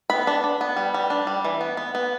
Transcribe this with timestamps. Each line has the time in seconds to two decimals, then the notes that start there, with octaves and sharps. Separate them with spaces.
0.10 B3 B5
0.27 D4
0.44 D4
0.61 B3
0.76 G3
0.94 G3
1.10 D4
1.27 G3
1.45 E3
1.61 B3
1.77 B3
1.95 B3